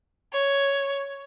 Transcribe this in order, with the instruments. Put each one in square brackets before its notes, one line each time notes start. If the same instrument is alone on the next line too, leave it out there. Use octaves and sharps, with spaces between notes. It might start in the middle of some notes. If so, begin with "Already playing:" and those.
[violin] C#5